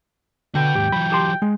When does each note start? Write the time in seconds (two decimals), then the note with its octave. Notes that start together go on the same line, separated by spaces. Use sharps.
0.55 D3 F#4 B4 G5
0.75 D#2 G#2 G4
0.92 E3 F#3 B5
1.12 G4 A5 C6
1.42 G#3